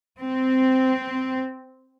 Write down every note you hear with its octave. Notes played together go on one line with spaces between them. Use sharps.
C4